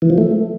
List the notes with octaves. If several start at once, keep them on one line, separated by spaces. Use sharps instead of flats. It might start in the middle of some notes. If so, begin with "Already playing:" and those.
E3
F3
A3